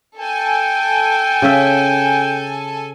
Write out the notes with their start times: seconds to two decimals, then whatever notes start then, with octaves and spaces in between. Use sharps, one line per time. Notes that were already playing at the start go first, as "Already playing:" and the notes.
0.19 A4 G5 G#5
1.42 C#3 E5